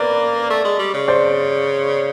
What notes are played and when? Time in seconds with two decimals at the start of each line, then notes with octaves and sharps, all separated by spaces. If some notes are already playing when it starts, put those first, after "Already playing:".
Already playing: A#3 B4 D5
0.50 A3
0.65 G#3
0.79 G3
0.94 C#3
1.08 C5 D5